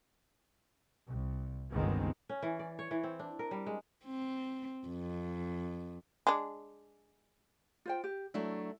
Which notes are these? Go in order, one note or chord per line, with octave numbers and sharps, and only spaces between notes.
C2
G1 C#2 D#3 G#3 B3 C4
C#4
E3
D5
C#5
E3
C4
D4
A#4
G3
G#3
C4
F2
G#3 D4
F4 C5 G5
G4
F#3 A3 D4 E4